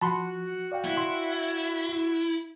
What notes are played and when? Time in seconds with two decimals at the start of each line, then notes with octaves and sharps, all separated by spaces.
0.01 F3 F#4 A5 B5 C6
0.72 D5 F5 G5
0.85 E4
0.97 E5 C6